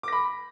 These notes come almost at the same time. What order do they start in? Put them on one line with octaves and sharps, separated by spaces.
D6 A#6 B5